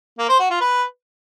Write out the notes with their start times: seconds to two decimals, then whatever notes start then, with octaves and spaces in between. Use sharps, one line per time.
0.18 A#3
0.29 C5
0.40 F#4
0.50 F4
0.61 B4